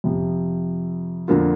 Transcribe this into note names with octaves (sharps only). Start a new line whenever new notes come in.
F2 C3 F3
F2 D3 A#3 F4